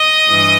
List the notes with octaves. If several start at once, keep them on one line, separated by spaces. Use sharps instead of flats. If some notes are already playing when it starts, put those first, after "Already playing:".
Already playing: D#5 D#6
G2 E3